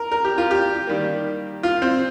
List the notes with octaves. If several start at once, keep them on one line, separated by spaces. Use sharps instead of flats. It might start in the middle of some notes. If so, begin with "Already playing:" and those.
Already playing: A#4
A#4
G4
F4
G4
D#3 G3 A#3
F4
C4